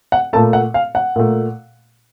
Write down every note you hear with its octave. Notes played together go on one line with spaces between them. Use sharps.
F#5
A#2 A3 A5
F#5
F5
F#5
A#2 A3